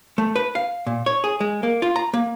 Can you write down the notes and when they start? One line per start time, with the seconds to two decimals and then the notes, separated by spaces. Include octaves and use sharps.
0.18 A3
0.36 B4
0.55 F5
0.87 A#2
1.06 C#5
1.24 G#4
1.40 G#3
1.63 A#3
1.82 F4
1.96 A#5
2.14 A#3